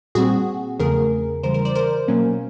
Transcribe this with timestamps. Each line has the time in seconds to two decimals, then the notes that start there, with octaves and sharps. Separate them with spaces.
0.15 A#2 G3 C4 F#4 G#4
0.79 E2 C#3 F3 A3 G#4 A#4
1.43 C#3 E3 G3 A#4 C5
1.54 A#4 C5
1.65 C5 D5
1.75 A#4 C5
2.08 B2 F#3 A#3 C#4